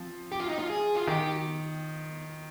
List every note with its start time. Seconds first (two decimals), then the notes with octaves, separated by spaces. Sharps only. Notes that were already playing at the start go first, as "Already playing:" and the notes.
Already playing: F3 C4
0.32 G4
0.40 F4
0.49 D#4
0.59 F4
0.69 G#4
0.96 F4
1.07 D#3 G4